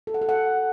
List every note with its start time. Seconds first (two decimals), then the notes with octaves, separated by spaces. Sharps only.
0.07 A4
0.14 F#5
0.22 A4
0.29 F#5